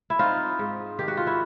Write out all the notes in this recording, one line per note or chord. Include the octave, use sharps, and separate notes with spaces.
E4
C4 D#4 F4
G#2
D#3 G4
F#4
F4
E4 F#4